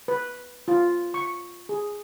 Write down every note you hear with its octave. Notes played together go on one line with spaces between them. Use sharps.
B4
F4
C#6
G#4